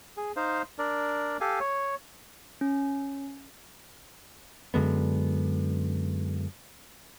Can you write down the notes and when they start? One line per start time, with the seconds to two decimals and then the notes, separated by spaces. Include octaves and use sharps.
0.17 G#4
0.36 D#4 C5 F5
0.79 D4 A#4 D5
1.41 G4 A4 F5 G#5
1.60 C#5
2.61 C#4
4.74 F#2 D3 G#3 B3